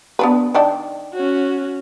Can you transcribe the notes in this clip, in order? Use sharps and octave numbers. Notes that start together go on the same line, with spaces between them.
B3 D4 B4
D#3 D4 G5
C#4 F#4